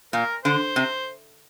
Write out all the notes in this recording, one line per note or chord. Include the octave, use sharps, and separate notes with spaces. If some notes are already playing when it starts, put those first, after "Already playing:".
A#2 A#4
D3 C5
C3